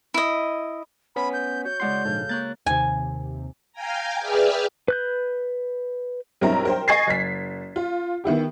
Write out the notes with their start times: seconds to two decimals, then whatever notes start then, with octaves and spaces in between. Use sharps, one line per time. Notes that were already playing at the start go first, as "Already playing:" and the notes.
0.14 E4 D#5
1.16 B3 C#4 B5 B6
1.33 G6
1.65 F#4 C#5 G6
1.80 C#3 G#3 E4 D5 F#5 C6
2.05 A#1 G#2 A4 F5
2.29 A#3 C#5 F#6 A6
2.66 D#2 C3 G#5
3.72 F5 G5 G#5 A#5
4.19 G#4 B4 D5 E5 G5 F6
4.88 B4 F#6 G6
6.41 B1 G2 C4 E4 A#4 A#5
6.65 A#4 C5 G5
6.88 D#5 G#5 C#6 G#6 A6 C7
7.07 F#1 B6
7.76 F4
8.24 D#3 B3 E4 G4